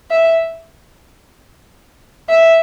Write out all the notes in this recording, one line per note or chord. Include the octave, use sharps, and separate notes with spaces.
E5
E5